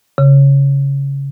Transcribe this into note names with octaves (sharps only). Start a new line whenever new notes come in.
C#3